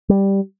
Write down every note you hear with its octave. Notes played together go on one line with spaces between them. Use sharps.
G3